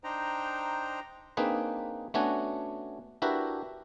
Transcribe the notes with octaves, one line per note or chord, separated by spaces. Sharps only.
D4 D#4 C5 G5 A#5
A#3 C4 D4 D#4 G#4 B4
A3 B3 C#4 D4 F#4 G#5
D4 E4 F#4 G4 A#4 B4